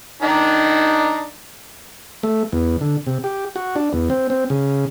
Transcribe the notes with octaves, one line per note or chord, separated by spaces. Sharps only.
D#3 D4 D#4
A3
E2
D3
C3
G4
F#4
D4
E2
C4
C4
C#3